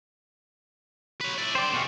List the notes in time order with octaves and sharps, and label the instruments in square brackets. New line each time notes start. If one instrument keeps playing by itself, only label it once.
[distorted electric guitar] B4 C#5
E4 D5
[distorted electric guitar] D3 G5 [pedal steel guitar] C5 D5
[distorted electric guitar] B2 G#3 [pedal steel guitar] F#4 C#5 F5